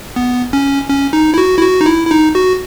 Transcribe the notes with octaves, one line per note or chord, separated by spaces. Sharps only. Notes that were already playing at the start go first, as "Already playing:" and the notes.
B3
C#4
C#4
D#4
E4
F#4
E4
F#4
D#4
E4
E4
D#4
F#4